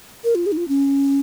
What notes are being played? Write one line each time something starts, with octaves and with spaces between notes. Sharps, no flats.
A#4
F4
G#4
D#4
F4
C#4